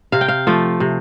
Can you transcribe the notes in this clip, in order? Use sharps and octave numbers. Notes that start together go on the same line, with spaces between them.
C3 F5
G5
F5
F3 A3
C3